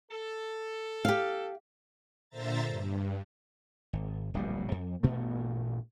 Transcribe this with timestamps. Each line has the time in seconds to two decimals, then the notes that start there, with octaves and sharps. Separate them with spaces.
0.11 A4
1.05 G4 F5
2.30 A#2 D3 C5 E5 A#5 A6
2.66 G2
3.93 G#1
4.34 D1 A#1 B2 G3
4.71 F2
5.03 A1 G2 A#2 A3